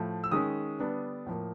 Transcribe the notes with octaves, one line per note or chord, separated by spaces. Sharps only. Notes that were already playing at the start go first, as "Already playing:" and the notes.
Already playing: A2 F3 A3
E6
D#3 G#3 C#4 D#6
D3 G3 B3 D4
A2 F3 A#3